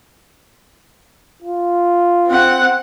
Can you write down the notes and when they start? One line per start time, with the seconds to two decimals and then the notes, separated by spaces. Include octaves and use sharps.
1.42 F4
2.26 C4 F#5